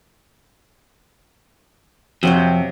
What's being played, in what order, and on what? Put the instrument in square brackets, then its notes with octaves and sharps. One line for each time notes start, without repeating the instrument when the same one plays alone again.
[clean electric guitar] F2 [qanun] C3 F#3 C5